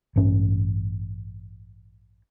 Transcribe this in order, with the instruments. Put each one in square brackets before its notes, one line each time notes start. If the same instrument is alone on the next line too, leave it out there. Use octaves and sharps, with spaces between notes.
[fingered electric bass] A1 G2 C#4